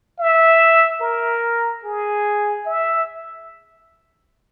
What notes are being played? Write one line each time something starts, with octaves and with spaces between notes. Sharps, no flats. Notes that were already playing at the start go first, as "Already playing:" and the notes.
E5
A#4
G#4
E5